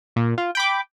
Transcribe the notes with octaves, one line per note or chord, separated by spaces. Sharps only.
A#2
F4
G5 B5 D6